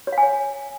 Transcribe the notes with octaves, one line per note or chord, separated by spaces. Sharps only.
C#5
F5
G#5
C#5